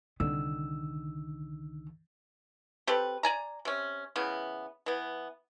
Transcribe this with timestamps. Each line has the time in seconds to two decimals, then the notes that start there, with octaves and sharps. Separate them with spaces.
0.20 C2 D3 D#3 E6
2.87 C4 G4 A4 B4
3.23 D5 G#5 A#5
3.65 C3 C#4
4.16 C#3 E3 B3
4.86 E3 B3